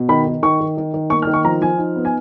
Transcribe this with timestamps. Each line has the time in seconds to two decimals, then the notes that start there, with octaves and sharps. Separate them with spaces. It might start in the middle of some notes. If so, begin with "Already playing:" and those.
Already playing: B2
0.09 D#3 B5
0.27 D#3
0.43 D#3 C#6
0.60 D#3
0.77 D#3
0.93 D#3
1.10 A#3 C#6
1.22 F6
1.27 D#3
1.34 C#6
1.45 F3 A#5
1.61 F3 G#5
1.78 D#4
1.96 B3
2.05 G#5